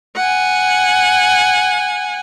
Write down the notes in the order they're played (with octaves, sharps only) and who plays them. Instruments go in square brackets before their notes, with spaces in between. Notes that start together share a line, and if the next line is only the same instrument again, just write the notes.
[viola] F#5 G#5